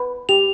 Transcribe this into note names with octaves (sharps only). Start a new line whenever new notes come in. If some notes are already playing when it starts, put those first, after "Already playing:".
Already playing: B4
G4 F7